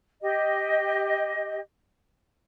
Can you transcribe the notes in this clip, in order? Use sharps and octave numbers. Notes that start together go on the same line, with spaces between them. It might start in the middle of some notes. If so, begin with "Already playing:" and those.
G4 D#5